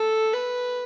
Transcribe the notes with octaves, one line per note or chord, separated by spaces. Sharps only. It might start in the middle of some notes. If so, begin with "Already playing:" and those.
Already playing: A4
B4